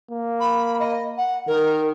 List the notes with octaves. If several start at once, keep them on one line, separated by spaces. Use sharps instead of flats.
A#3
B5
D#5
F#5
D#3 A#4